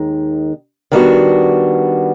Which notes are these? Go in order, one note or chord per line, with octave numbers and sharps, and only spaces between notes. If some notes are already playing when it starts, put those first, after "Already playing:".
Already playing: D#2 D#3 G#3 D#4
D#3 G3 B3 D4 F#4